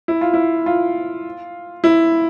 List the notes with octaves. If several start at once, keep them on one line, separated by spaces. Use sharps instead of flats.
E4
F4
E4
F4
E4